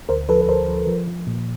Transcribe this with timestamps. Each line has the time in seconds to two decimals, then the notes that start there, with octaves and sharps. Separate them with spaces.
0.09 D2 A#4 C5
0.29 F3 A4 B4
0.41 B4
0.49 D2 A#4 C5
0.68 F3
0.87 F3
1.07 F3
1.27 A#2